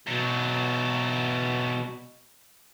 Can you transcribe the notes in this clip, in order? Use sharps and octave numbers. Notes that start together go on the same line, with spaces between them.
E2 B2 F#3